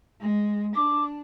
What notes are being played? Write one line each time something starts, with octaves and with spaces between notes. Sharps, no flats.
G#3
D4 D6